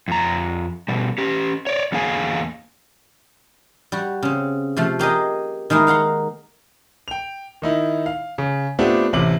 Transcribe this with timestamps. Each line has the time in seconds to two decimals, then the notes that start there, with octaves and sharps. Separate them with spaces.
0.08 F2 A#5
0.88 B2 G3
1.18 C#4 G4
1.67 C#5 D5
1.92 E2 D3 A#3 G#4 F5 G#5
3.92 G3 F#4
4.23 C#3 C4
4.77 C3 F3 A3
4.99 A#3 G4 G#4 D#5
5.70 D#3 G#3 A#3 D#4 E4
5.87 F5 F#5 A#5 C6
7.08 G5 F7
7.62 D#3 D#4 E4
8.06 F5
8.38 C#3
8.79 A3 B3 C4 D4 F4 G4
9.13 A1 C3 F#7